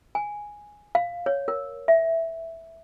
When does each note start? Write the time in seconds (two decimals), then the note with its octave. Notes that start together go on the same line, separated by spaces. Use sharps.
0.15 G#5
0.95 F5
1.26 C#5
1.48 A#4
1.88 E5